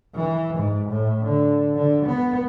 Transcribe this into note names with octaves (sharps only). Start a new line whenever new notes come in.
E3
G#2
A2
D3
D3
B3